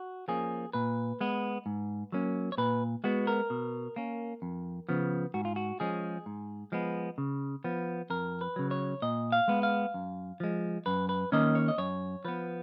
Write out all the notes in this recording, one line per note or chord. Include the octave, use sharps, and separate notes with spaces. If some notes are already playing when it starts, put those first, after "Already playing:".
Already playing: F#4
F3 A#3 C#4 G#4
A#2 B4
G#3 B3
G#2
F#3 A#3 C#4
C#5
A#2 B4
G#3 B3 F#4
A#4
B2
A#3 C#4
F2
C#3 F3 B3
G#2 F#4
F4
F#4
F3 G#3 C#4 G#4
G#2
F3 G#3 B3
C#3
F3 B3
F2 A#4
B4
C#3 F#3
C#5
A#2 D#5
F5
G#3 B3
F5
F#2
F3 G#3
F#2 B4
B4
D#3 A#3 C#4 D#5
C#5
D#5
F#2 C#5
F3 B3 B4